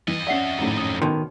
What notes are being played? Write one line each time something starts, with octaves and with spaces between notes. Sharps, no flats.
F2 E3 D#5
C#4 D5 E5 F#5 C7
G#1 F#2 A2
D#6
B2 D#3 C6